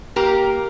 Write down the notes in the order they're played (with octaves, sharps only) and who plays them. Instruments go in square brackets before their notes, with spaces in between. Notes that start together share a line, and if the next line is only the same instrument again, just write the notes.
[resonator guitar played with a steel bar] A#3 G4 A#4